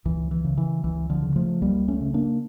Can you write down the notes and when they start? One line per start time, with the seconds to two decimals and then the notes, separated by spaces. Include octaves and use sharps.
0.05 C#2 E3
0.31 E3
0.44 C#3
0.58 E3
0.84 C#2 E3
1.10 D3 F3
1.23 C#3
1.36 F3 A3
1.62 C#2 G3 A#3
1.88 A3 C#4
2.01 C#3
2.14 A#3 D4